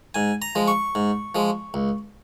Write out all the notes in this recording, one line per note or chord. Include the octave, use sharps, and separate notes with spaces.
G#2 G#5
A#5
F3 G#3
C#6
G#2
F3 G#3
C#2